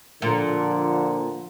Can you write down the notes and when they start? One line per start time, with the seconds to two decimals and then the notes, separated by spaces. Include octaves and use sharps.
0.22 A#2 D3 F3